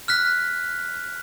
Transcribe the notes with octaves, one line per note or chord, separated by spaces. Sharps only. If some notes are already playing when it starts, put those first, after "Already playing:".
F6 F#6 B6